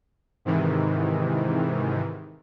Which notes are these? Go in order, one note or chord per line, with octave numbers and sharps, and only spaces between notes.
G#2 C3 D#3 E3